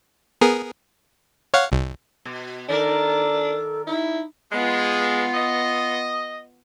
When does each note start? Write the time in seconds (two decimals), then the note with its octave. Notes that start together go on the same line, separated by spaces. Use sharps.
0.41 B3 G#4 A#4
1.54 C#5 F5 F#5
1.72 C2
2.25 B2
2.69 D#3 D4 A4 A#4 D5
3.87 D#4 E4
4.52 G#3 B3 F4
5.34 D#5